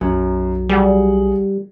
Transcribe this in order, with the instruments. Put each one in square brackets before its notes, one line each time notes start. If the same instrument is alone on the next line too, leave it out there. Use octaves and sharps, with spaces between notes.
[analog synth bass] B1 [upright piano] F#2 [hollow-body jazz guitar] F#3
[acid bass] G3 [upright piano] G#4 F#5